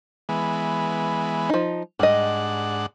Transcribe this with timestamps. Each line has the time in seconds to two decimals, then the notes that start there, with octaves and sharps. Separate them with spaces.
0.29 E3 G#3 B3
1.49 F3 D#4
1.99 G#2 G3 D4 D#5 F#5